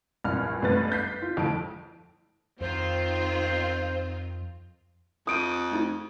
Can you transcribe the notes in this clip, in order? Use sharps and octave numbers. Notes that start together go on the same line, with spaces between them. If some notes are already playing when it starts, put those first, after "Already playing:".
A#1 E2 G2 B5 F6
A1 G2 A3 B3 B4 A6
G6 B6 C7
F4
G1 F2 A2 A5 D7
F2 D#3 C4 F4 C5
F2 D#6 D7 D#7
A3 D#4 E4